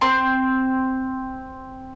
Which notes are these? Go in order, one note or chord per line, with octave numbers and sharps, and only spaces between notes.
C4 C6